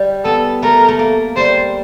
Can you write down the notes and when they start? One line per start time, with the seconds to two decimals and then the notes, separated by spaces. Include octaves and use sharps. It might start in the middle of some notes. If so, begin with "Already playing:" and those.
Already playing: G3
0.25 B3 A4
0.63 A3 A#4
0.88 A3
0.99 A#3
1.36 G3 C5